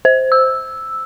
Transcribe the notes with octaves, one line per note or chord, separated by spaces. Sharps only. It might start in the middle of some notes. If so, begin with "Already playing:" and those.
C5
E6